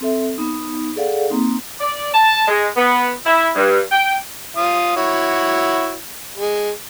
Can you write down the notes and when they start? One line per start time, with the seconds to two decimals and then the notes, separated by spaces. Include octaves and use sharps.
0.01 C4 A4 E5
0.38 B3 D#4
0.96 G#4 A4 D5 F5 F#5
1.30 A#3 C4 D#4
1.80 D5
2.14 A5
2.48 G#3
2.77 B3
3.26 E4
3.55 G2
3.92 G5
4.57 F4 F5 D#6
4.96 E4 F#4 C#5
6.37 G#3